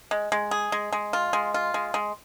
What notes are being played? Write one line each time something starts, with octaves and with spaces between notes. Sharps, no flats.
G#3
G#3
G#4
G#3
G#3
F4
G#3
F4
G#3
G#3